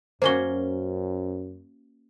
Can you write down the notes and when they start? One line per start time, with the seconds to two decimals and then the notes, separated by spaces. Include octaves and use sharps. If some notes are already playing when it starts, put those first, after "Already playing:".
0.22 F#2 A#3 C#4 F#4 C5 G7